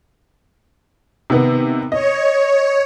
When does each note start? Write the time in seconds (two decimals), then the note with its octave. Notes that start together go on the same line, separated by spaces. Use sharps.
1.30 C3 D#3 B3
1.92 C#5 D#5